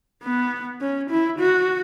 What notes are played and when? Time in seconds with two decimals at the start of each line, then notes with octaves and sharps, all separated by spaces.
0.24 B3
0.81 C#4
1.10 E4
1.39 F#4